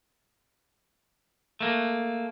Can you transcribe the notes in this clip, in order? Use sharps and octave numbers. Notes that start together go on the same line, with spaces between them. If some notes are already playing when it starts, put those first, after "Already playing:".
A3 A#3